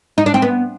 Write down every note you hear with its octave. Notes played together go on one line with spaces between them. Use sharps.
D#4
D4
C4
B3